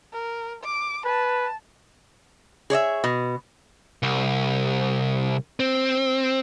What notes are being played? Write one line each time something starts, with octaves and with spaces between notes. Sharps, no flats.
A#4
D6
B4 A5
G#4 C#5 D#5 E5
B2
C2
C4